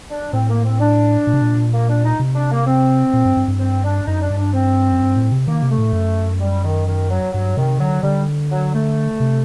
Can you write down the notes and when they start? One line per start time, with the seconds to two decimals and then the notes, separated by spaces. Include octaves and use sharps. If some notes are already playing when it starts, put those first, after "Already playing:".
0.10 D4
0.33 A2 C4
0.49 A#3
0.65 C4
0.80 D4
1.27 A#2
1.34 C3
1.42 A#2
1.73 A#3
1.89 D4
2.04 D#4
2.20 C3
2.35 D4
2.51 A#3
2.67 C4
3.13 A#2
3.25 G2
3.37 G2
3.48 G2
3.60 C4
3.84 D4
4.07 F#2 D#4
4.22 D4
4.30 G2
4.38 D4
4.53 C4
4.92 F#2
5.01 G2
5.16 A2
5.32 C3
5.47 D#3 A#3
5.63 C3
5.70 A3
5.78 A2
5.93 F#2
6.40 G3
6.64 D#3
6.87 D#3
7.10 F#3
7.33 G2 F#3
7.57 C3 D#3
7.80 D3 F#3
8.03 D3 G3
8.50 F#3
8.74 A3
9.20 C3